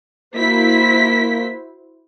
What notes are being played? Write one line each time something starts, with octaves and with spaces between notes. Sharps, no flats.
A#3 E4 F#4 C5 B6